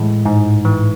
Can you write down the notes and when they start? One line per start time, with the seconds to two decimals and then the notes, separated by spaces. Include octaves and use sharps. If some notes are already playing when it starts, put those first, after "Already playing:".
Already playing: A2 E3 G#3
0.25 G#2
0.65 E3